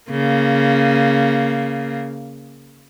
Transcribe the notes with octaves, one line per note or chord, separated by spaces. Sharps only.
C#3 A#3